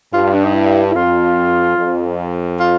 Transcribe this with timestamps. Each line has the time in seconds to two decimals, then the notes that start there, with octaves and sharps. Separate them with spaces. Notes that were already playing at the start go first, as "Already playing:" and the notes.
0.13 G2 F4
0.34 D4
0.44 D#4
0.54 E4
0.91 E4
0.95 F2 F4
1.77 F2
2.60 F4